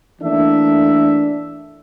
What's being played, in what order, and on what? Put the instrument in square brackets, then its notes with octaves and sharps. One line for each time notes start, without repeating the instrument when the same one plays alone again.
[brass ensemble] E3 A3 A#3 D4 E5